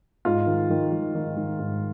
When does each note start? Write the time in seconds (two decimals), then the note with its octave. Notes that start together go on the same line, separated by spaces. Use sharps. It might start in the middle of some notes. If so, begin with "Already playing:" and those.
0.25 G#2 F4
0.47 D#3
0.70 D#3
0.92 D#3
1.15 D#3
1.37 D#3
1.59 G#2